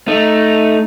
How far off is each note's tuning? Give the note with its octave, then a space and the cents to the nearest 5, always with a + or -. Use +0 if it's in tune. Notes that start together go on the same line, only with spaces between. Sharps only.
A3 +0 D#4 -5